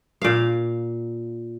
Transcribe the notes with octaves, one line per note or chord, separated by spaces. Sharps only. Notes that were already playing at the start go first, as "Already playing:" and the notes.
A#2 F5